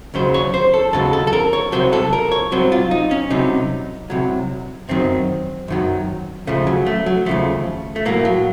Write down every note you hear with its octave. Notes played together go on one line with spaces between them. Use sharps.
D#2 C#3 F#3 C5
C#5
C5
A4
D#2 C#3 F#3 A4
A4
A4
A#4
C#5
C2 C3 F#3 C5
A4
A#4
C#5
C2 C3 F#3 C5
F4
D#4
C#4
C2 C3 F#3 D#4
C2 C3 F#3
F#2 D#3 F#3 C4
F#2 D#3 F#3
D#2 C#3 F3 A3
F#3
A3
F#3
D#2 C#3 F3 A3
A3
A2 F#3 A#3
F#3